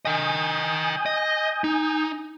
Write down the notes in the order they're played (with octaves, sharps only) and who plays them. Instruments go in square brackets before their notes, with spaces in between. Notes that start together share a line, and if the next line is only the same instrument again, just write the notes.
[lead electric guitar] D#5 G5 [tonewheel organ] G#5 D#6 G6
[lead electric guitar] D#5
D#4